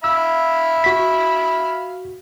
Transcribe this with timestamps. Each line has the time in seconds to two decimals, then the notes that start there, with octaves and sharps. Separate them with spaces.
0.04 E5 F5 B5 E6
0.84 F#4 B6